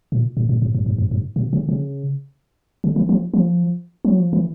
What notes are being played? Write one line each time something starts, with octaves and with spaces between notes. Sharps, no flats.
A#2
A2
A2
G#2
G2
G2
F#2
G2
B2
C#3
C#3
D3
E3
F3
F3
F#3
F3
E3